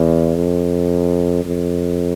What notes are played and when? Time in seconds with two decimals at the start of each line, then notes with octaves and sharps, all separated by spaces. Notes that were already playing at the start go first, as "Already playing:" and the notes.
Already playing: E2
0.35 F2
1.45 F2